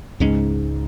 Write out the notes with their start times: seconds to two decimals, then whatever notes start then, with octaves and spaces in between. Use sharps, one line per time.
0.20 C#2 G#2 C#3 G#3 C#4